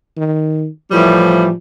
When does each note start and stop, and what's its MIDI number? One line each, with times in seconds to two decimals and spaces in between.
0.17 0.67 51
0.92 1.47 45
0.92 1.47 52
0.92 1.53 53
0.92 1.47 55